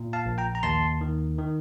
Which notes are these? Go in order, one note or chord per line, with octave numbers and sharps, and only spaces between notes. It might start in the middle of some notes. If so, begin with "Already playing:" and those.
Already playing: A#2
F5 A5
A#1
G5 A#5
A#5
D#2 A5 C6
D#3
D#3